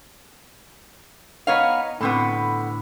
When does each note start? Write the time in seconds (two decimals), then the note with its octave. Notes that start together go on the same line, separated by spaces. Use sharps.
1.47 B3 D#4 C#5 F5
2.01 A2 D3 B3 C4 A4